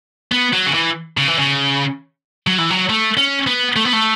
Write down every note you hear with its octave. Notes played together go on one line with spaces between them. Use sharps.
B3
F#3
C#3
E3
C#3
E3
C#3
F#3
E3
F#3
A3
C#4
B3
A3
B3
A3